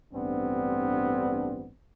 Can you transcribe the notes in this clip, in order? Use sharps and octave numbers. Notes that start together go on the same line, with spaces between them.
A1 G2 B3 C4 D4